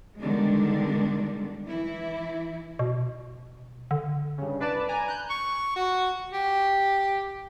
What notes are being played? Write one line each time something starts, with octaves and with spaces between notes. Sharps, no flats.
B2 D3 D#3 G3 G#3 D4
E3 E4
B2
D3
G2 C#3
C2 D4 B4 D5 A5
G#5 A#5
F#6 G6
C#6
F#4
G4